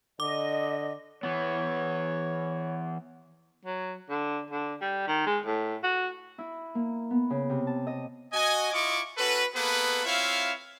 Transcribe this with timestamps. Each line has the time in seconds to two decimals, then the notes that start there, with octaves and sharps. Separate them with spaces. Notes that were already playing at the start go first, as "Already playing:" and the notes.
0.20 D3 D#5 D6
1.23 E3 B3 C#5
3.65 F#3
4.10 D3
4.51 D3
4.82 G3
5.08 D#3
5.27 G#3
5.46 A2
5.84 F#4
6.38 E4
6.75 A#3
7.10 B3
7.30 C#3
7.50 C3
7.67 A5
7.87 D#5
8.33 F#4 D#5 G#5
8.73 E4 F4 D#5 C#6 D6
9.18 C#4 F#4 A4 B4
9.54 A#3 B3 G#4 A4 B4
10.04 C4 E4 F4 C#5 E5 F5